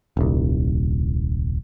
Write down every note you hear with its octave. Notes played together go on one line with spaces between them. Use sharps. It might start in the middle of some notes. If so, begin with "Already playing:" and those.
D#1 C2